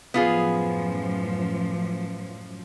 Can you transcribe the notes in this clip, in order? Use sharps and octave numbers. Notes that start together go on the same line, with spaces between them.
F#2 A2 F3 B3 F4 G#4